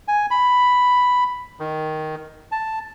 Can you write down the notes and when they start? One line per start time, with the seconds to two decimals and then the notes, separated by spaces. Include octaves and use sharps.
0.08 G#5
0.31 B5
1.59 D#3
2.52 A5